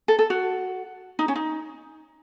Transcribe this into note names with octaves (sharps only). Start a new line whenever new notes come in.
A4
A4
F#4
D#4
C#4
D#4